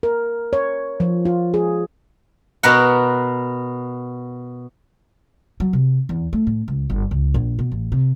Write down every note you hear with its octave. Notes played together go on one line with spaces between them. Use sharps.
A#4
C#5
F3
F4
G#4
B2 B3 A#4 F#5
F#3
C3
E2
A3
A2
C#2
G1
C#2
A#1
B2
A1
C3